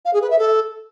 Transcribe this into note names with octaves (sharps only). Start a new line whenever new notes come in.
F5
G#4
B4
E5
A4